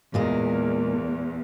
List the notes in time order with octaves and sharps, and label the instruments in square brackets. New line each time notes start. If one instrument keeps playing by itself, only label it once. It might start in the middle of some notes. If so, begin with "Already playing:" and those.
[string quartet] E2 [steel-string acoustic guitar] A#2 G#3 A#4